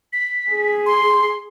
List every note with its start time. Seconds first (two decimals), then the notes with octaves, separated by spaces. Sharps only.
0.13 B6
0.51 G#4
0.86 C6